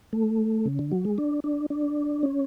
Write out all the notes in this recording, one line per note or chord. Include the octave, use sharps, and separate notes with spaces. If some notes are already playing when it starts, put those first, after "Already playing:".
A3
C#3
D3
F#3
G#3
D4
D4
D4
C#4